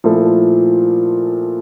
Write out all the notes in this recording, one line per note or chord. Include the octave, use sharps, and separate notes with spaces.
A#2 F3 A3 E4 A4